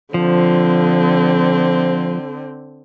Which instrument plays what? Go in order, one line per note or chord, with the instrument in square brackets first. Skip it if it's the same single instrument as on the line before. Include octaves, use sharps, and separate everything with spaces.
[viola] D3 C4 [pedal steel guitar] F3